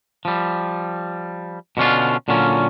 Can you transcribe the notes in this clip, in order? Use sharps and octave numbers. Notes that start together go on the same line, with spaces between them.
F3 G3
B2 D3 C#4 D4 F4
A#2 D3 F#3 C#4 F4